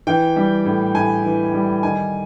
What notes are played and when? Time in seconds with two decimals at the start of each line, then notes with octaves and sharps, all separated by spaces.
0.07 E3 G5
0.36 G3
0.65 A2
0.94 A2 G#5
1.24 E3
1.54 G3
1.83 D#3 G#5